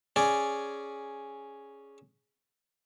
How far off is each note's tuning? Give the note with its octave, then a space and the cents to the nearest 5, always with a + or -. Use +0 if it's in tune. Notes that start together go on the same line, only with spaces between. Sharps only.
C#4 +0 G#4 +0 D5 -5